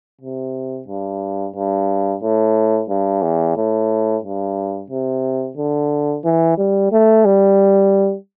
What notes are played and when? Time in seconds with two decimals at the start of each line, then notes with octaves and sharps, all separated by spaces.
0.21 C3
0.88 G2
1.55 G2
2.22 A2
2.89 G2
3.22 E2
3.57 A2
4.23 G2
4.90 C3
5.57 D3
6.25 E3
6.58 G3
6.92 A3
7.25 G3